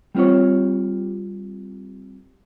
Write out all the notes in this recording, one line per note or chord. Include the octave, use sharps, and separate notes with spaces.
G3 C4 F4 C5 C#5